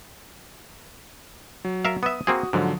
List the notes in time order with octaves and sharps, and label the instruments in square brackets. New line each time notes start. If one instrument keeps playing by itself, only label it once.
[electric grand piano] F#3
[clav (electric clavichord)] A#4 E5 F5
[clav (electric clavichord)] B3 E5 [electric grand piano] D#6
[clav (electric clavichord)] A#3 C4 G#4 [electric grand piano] F#4
[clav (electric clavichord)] G#2 [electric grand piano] D3 F3 F#3